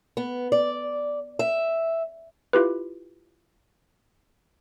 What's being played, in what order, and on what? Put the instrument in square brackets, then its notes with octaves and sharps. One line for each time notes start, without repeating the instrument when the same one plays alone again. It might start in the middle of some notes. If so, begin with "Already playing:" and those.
[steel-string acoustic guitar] B3
D5
E5
[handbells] E4 F4 G4 B4